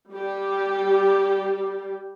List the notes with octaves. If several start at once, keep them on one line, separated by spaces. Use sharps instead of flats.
G3 G4